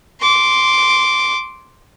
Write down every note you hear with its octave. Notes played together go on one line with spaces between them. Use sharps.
C6 D6